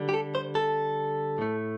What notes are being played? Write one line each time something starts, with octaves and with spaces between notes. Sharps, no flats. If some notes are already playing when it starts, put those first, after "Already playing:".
Already playing: D3 G3
G4
A4
C5
A4
A2 A3